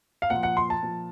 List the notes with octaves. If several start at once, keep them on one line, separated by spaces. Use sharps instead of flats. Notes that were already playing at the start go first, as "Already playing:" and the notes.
F5
A#2 F3 F#5
F#5
C6
A5
A#2 F3